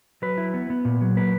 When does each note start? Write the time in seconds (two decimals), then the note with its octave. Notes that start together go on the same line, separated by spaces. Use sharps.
0.22 F#3 B4
0.38 E4
0.54 B3
0.70 B3
0.85 A#2
1.01 F#3
1.17 A#3 B4